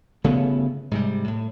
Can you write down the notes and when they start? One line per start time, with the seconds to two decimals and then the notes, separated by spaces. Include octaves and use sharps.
0.24 G1 C#3 A3 B3
0.91 G#2 C3 G3
1.28 A2